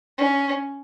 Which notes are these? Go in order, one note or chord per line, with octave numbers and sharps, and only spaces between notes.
C#4